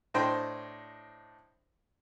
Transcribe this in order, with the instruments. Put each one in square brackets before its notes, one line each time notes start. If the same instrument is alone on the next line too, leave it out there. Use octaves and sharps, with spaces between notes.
[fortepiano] A2 D4 C5 D#5 G5 C6